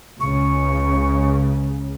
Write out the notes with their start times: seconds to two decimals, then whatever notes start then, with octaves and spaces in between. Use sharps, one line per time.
0.20 C#2 C#3 C#6